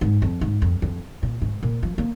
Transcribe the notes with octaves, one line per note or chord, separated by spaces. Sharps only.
G#2
F2
G#2
F2
F2
A#2
G#2
A#2
F3
A#3